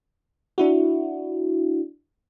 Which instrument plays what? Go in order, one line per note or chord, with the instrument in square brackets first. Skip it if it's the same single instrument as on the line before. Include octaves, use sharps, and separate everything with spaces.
[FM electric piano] D4 E4 F#4